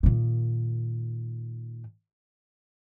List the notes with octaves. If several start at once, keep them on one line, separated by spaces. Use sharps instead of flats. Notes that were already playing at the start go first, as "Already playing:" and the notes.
A#2 D#3